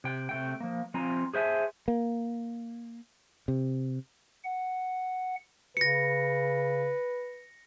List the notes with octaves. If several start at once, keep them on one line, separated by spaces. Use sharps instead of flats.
C3 G5
C3 A3 G5
F3 A#3
F3 C4 F4 G#5 A#5
G#4 C5 E5 G#5 A5
A#3
C3
F#5
C#3 B4 A#6 C#7